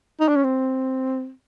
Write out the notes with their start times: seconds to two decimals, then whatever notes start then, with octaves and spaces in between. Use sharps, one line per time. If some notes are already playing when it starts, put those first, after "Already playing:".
0.21 D#4
0.28 D4
0.36 C#4
0.44 C4